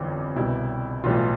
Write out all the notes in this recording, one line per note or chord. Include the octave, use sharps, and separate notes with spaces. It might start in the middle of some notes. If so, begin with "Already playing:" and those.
Already playing: G1 F2 E3 G3
C2 B2 G3 E4
B1 A2 E3 G3 F4